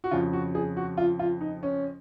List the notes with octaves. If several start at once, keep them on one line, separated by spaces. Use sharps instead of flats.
F#4
F2 C#3 F4
F#4
G#4
F#4
F4
F4
D#4
C#4